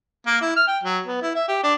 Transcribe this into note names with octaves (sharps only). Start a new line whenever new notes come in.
A#3
E4
F6
G5
F#3
B3
E4
E5
G4
D4